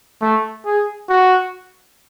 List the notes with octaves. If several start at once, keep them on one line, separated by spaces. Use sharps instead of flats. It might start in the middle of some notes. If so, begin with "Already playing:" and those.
A3
G#4
F#4